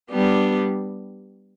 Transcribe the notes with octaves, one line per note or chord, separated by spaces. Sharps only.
G3 B3 D4 G4